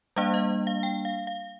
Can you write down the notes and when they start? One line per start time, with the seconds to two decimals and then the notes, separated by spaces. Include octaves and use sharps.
0.16 G3 A#3 D4 F5
0.34 D#5
0.67 F5
0.83 G5
1.05 F5
1.27 F5